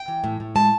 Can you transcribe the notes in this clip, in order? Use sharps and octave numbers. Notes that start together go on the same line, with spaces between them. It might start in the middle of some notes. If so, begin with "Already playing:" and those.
Already playing: G5
E3
A2
A2
G#3 A5